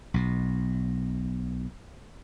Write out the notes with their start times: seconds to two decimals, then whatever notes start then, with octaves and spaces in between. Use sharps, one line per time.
0.14 B1 B2